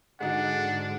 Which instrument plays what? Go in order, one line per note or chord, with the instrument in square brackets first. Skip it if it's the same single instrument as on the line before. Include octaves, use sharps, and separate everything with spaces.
[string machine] G#2 D3 [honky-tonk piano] G#3 D#4 F#4 [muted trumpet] D4 [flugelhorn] F#5